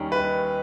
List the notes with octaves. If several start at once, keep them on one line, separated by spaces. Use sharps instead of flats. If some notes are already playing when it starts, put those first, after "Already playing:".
Already playing: D#2 D#3 G3 C#4 A#4
B4